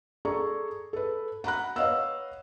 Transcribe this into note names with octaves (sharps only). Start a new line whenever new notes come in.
G#4 A4 D5 A#5 C#6
A4 B4
F#5 A#5 B5 F#6
B4 C#5 D#5 F5 F#5 E6